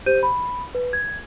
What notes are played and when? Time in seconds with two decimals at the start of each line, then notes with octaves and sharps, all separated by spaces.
0.06 G4 C5 G6 D#7
0.23 B5
0.75 B4
0.93 G#6